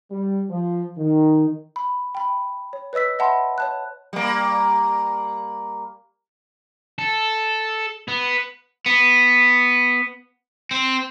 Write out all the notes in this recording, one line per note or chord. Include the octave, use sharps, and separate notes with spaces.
G3
F3
D#3
B5
G5 B5
C#5
B4 C#5 D#5 E6 B6
D#5 E5 F#5 A5 B5 C6
C#5 A5 F#6
G3 A#3
A4
B3
B3
C4